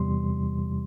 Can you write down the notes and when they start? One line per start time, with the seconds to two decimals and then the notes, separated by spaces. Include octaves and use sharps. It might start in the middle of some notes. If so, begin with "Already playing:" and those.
Already playing: E2 C3 E3 G3 C6